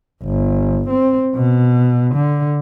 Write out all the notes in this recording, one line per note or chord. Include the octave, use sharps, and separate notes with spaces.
G1
C4
B2
D3